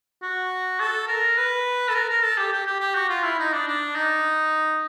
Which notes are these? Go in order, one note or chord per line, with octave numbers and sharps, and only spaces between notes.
F#4
A4
A#4
B4
A4
A#4
A#4
A4
G4
G4
G4
G4
F#4
F4
E4
D#4
D4
D4
D#4